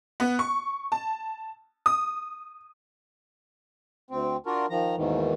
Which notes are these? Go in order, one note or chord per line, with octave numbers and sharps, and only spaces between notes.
B3
C#6
A5
D#6
D2 C4
D4 F4 F#4 A#4
D#3 F3 A#5
D#2 G#2 B2 D#3 E3